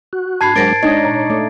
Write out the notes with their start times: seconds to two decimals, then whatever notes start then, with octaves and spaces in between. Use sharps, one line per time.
0.13 F#4
0.41 G#2 D4 A5 B5 G#6 C7
0.56 F#3 G#3 D4 A#4 C5 A6 A#6 D7
0.83 G#3 D4 D#4 C#5 D#5 G#6
1.05 A#2
1.30 A3 D6